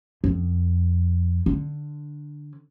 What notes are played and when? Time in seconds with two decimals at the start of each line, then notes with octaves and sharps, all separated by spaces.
0.24 F2
1.46 D3